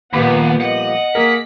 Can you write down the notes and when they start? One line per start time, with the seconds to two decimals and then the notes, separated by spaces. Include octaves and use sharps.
0.13 D#2 A#2 F3 G3 B3 G4 F#5 B5
0.61 D#5 F#5
1.15 A#3 G#4 A#4 B6